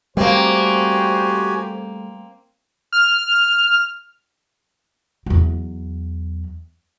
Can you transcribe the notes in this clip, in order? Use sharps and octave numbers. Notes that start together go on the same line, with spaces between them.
G3 A3 A#3 C4 F#4 G4 C5 G#5
F6
E2 F#3